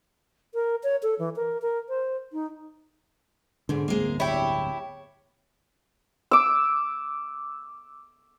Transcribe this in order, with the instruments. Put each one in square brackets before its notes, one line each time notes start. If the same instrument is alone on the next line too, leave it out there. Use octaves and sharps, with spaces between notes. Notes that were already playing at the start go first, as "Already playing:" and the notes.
[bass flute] A#4
C#5
A4
E3
A#4
A#4
C5
D#4
[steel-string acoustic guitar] G#2 B2 [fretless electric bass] D3
[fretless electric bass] D1 G1 C4 [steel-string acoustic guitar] G#3 A#3
[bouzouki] E4 G4 [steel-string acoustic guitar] C#5
[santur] D6 E6